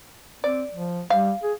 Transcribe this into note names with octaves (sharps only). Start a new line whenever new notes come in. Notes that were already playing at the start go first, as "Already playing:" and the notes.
C4 D5
F3
G3 F5
G#4